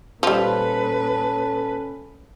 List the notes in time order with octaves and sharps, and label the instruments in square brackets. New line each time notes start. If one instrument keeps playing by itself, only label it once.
[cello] A#2 B4 [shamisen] F3 G3 [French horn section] C#4 A4